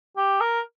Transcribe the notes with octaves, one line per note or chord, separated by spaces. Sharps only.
G4
A#4